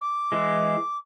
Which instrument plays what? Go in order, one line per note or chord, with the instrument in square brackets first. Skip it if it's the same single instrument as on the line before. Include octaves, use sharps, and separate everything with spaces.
[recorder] D6
[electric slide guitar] E3 G#3